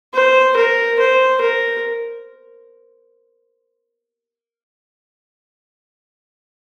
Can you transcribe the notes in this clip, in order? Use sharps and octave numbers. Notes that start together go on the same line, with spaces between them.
C5
A#4
C5
A#4